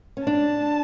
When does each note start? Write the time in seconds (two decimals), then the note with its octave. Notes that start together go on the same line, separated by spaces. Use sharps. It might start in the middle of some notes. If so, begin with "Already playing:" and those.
0.17 C#4
0.26 D4 A5